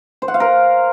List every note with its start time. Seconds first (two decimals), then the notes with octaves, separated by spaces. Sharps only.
0.22 C5
0.28 F#5
0.34 F5
0.40 A#4